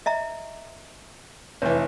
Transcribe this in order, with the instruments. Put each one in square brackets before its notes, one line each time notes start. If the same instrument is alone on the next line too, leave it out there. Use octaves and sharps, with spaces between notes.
[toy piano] D#5 E5 A#5
[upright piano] F1 E3 [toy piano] C#5